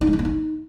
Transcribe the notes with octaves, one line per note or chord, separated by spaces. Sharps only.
D#4
G#3
D4
A#3
D#4